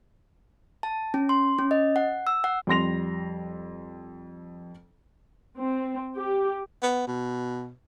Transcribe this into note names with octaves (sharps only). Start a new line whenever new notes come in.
A5
C#4
C6
C#4
D#5
F#5
E6
F#5
F2 G3 C6 A#6 F7
C4
G4
B3
B2